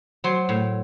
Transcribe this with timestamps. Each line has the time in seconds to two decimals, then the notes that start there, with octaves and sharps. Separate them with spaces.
0.24 F#3 C5
0.49 A2